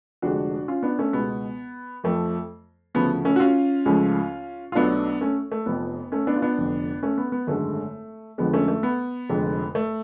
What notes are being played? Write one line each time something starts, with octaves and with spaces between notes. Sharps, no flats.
F1 F2 D3 F3 G#3 D4 F#4
C#4 F4
B3 D4
A3 C#4
C#2 B2 G#3 B3
F2 F3 A3
D2 C#3 F3 B3
A3 C#4
F#4
C#4 F4
C#2 C#3 F3 A3
F4
B1 B2 F#3 A3 B3 D4
A3 C#4
A3
F1 F2 F3 B3
A3 C#4
B3 D4
F4
B3 D4
F1 F2 D3
A3 C#4
B3
B3
G#1 F#2 D3 G#3 A3
F2 D3 F3 G#3 B3
A3 C#4
A3
B3
F1 F2 D3 G#3
A3